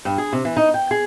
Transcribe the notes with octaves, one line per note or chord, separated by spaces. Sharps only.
G2
G#4
C3
E3
D#4
G5
G#4